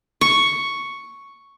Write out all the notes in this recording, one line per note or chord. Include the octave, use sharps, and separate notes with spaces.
C#6